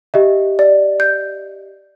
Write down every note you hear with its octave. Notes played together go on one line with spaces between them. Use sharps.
G4 D#5 E5
D5
G6